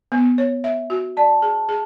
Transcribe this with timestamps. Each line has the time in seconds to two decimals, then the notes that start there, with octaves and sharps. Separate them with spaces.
0.12 B3
0.38 C#5
0.64 E5
0.90 F#4
1.17 D5 A5
1.42 G#4
1.69 G#4